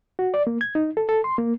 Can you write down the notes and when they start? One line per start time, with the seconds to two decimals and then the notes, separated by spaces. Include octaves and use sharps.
0.19 F#4
0.34 D5
0.47 A#3
0.61 G#6
0.75 D#4
0.97 A4
1.09 A4
1.24 C6
1.38 A#3